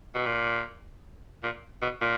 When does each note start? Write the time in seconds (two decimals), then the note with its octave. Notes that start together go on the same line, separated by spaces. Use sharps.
0.15 B2
0.26 A#2
1.43 A#2
1.82 B2
2.01 A#2